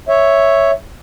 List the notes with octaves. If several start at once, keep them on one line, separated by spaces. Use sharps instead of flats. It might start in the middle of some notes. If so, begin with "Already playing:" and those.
C#5 E5